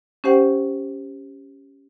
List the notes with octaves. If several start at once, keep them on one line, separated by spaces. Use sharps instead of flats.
C#4 G4 C5 F#5 G5